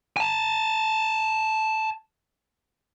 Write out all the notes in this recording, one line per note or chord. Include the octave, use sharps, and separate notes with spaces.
G#5 A5